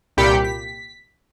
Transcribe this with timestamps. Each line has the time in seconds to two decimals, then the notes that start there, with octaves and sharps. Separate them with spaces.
0.17 C2 A#2 G4 B5 B6 C#7
0.44 B6